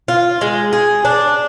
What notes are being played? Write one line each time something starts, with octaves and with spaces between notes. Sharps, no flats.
F4
G#3
G#4
D4